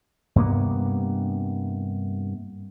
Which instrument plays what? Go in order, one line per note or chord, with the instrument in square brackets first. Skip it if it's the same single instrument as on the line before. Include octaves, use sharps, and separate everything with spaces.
[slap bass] G2 C3 A#3 B3